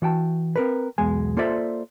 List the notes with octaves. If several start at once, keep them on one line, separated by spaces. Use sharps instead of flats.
E3 F#4 G5 A5
C4 A#4 B4
B1 E2 B2 G#3 G#5
A#3 F4 A4 C5 D5 E5